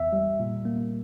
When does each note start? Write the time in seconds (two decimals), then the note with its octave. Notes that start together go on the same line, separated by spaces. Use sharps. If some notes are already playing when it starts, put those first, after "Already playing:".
Already playing: E2 E5
0.13 G3
0.39 A#2
0.65 A#3